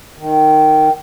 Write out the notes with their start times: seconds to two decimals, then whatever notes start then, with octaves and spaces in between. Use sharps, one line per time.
0.17 D#3